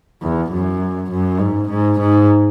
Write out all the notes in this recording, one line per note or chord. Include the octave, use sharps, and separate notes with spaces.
E2
F#2
F#2
G#2
G#2
G#2